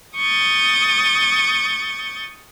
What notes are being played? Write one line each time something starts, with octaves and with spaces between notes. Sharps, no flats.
C#6 D#6 G6 A6